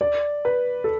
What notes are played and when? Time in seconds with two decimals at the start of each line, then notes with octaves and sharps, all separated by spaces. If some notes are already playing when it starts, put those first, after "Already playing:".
0.01 D5
0.45 B4
0.84 A4